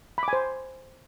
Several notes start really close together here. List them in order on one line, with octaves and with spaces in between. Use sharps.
B5 D6 G#5 C5